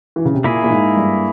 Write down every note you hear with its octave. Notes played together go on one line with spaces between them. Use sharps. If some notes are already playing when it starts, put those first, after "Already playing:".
E3
C#3
C3
A#2 A#3 E4 G#4
A#2
G#2
G2